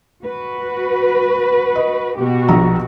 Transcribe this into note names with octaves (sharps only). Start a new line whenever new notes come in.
F#4 B4
D#5
B2 F#4 G4
A#1 A#5